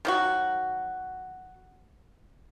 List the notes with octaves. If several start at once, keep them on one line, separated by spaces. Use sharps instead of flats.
D#3 F#3 F#4